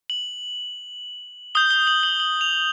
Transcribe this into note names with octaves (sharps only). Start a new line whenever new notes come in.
F#7
D#6 G6 G7
G7
F#7
F#7
F#7
F7